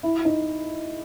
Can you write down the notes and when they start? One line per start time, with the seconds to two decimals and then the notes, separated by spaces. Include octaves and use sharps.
0.03 E4
0.25 D#4